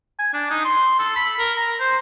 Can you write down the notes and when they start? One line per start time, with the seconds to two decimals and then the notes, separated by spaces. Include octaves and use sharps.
0.19 G#5
0.34 D4
0.50 D#4
0.65 C6
0.99 A4
1.16 B5
1.39 A#4
1.57 A#5
1.80 C5